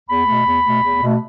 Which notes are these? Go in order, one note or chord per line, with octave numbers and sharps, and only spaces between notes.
E2 B5
B2 A3
E2
B2 A3
E2
B2 A3